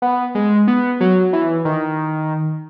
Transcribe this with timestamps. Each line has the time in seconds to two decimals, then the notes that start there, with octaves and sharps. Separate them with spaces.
0.02 B3
0.35 G#3
0.67 B3
1.00 F#3
1.33 E3
1.65 D#3